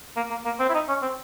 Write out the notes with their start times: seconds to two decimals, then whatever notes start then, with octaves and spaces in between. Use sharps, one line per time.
0.17 A#3
0.31 A#3
0.45 A#3
0.60 C4
0.69 E4
0.74 D#4
0.89 C#4
1.02 C4